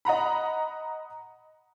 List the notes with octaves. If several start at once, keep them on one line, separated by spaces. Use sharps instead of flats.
D#5 F#5 A#5 B5